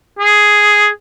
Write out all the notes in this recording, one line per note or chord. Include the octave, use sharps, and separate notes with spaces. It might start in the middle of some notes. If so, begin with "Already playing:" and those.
G#4